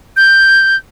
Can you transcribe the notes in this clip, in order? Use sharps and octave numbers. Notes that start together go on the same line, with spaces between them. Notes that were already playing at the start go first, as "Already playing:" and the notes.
G6